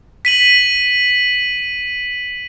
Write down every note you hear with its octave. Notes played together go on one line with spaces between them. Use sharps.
B6 D#7 F#7